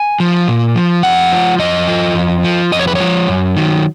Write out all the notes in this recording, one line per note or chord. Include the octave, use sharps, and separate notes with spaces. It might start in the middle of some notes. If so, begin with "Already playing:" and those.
Already playing: G#5
F3
A#2
F3
F2 F#5
F3
F2 D#5
F3
F2
F3
F2 D#5
C#5
B4
F3 C#5
F#2
D#3 F#3